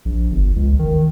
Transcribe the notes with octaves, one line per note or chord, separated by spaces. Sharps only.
A#1
G1
C#2
D#3